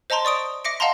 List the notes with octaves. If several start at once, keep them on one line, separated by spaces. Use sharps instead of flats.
C5 D#5 A5 A#5 C6
D5 C#6 D#6 D7
E5 D6 A#6 C#7 D7
D#5 F5 F#5 A5 A#5 C6